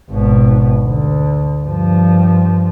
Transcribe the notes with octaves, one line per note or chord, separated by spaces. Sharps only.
G#1 B2
D2
G2 F3